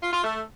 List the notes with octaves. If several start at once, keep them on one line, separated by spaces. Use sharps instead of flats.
F4
F4
A3